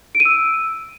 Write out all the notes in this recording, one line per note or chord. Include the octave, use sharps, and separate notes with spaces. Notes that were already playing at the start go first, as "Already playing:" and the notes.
D7
D#7
E6